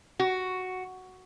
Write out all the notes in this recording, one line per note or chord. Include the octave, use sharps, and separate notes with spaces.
F#4